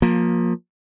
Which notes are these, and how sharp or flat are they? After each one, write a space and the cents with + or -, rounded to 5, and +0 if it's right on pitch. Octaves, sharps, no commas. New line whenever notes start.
F3 +30 A#3 +10